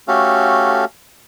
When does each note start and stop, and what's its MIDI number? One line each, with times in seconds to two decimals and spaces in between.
0.08 0.85 57
0.08 0.85 61
0.08 0.85 66
0.08 0.85 67
0.08 0.85 69
0.08 0.85 77